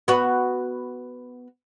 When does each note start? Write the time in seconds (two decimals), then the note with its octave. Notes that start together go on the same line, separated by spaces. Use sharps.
0.08 B3 F#4